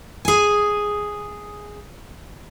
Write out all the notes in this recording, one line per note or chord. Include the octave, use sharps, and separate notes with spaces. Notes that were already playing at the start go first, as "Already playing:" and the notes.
G#4 G#5